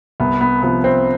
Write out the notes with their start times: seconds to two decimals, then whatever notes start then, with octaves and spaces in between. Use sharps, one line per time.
0.20 C2 B3
0.41 B3
0.63 C3 F3 B3
0.84 C4